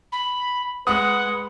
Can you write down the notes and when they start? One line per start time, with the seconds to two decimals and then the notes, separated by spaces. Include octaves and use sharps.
0.12 B5
0.87 G#3 B4 F#5 D#6